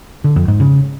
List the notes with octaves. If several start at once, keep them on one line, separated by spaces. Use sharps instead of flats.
D3
F2
G#2
C#3